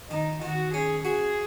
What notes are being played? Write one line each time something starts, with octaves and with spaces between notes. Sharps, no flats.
D#3 D#4
D#3 F#4
C#4 G#4
F#4 G#4